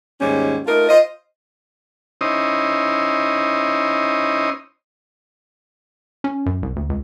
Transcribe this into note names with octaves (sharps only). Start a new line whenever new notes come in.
D#2 G#2 G3 C#4
A3 D#4 F4 A#4
F4 C5 D#5
C#4 D#4 E4 C5 D#5
C#4
F#2
C2
D2
C#2